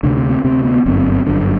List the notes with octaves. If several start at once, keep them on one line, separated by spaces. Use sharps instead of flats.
D2 C3 D4
C4
C4
D2 C3 C4
B3
G1 F#2 D3 C4
C4
C4
G1 F#2 D3 D4